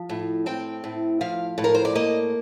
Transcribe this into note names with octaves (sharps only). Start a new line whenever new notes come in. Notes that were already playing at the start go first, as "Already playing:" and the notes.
Already playing: F3
A2
C4 G5
A2
F3 F5
A2
A#4
C5
D5
A#3 D#5